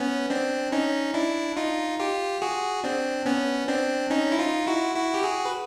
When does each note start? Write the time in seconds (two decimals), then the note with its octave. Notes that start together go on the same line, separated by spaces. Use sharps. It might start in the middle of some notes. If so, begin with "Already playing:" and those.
Already playing: B3 C#4
0.30 C4 D4
0.72 C#4 D#4
1.14 D4 E4
1.57 D#4 F4
1.99 F4 G4
2.42 F#4 G#4
2.84 C4 D4
3.26 B3 C#4
3.68 C4 D4
4.10 C#4 D#4
4.32 E4
4.39 D#4 F4
4.67 E4 F#4
4.95 E4 F#4
5.14 G4
5.23 F#4 G#4
5.45 B4